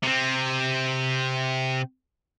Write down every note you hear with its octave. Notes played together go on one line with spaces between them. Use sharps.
C3 C4